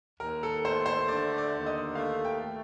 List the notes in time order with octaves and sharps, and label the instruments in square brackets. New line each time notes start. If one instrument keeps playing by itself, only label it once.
[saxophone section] D#2 [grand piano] A#4
[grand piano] A4
[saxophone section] A3 [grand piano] C5
[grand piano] C5
[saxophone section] D3 [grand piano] D5
[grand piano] D5
[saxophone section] D#2
[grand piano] D#5
[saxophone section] A3 [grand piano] F5
[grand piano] G5
[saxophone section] A3